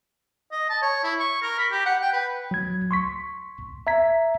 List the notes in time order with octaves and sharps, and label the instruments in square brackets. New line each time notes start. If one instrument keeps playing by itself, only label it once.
[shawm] D#5
A5
C#5
E4
C#6
A#4
B5
G4
F#5
G5
B4
[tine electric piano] F#3 G#6
C6 C#6 B6
E5 A#5 G#6 B6